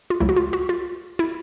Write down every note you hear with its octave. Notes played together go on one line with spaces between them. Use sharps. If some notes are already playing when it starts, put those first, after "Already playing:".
F4
C#2 C#3 F#3 A3 E4
F#4
F4
F#4
F4
E4